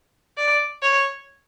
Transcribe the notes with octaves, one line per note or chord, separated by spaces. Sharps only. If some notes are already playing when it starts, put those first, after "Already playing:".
D5
C#5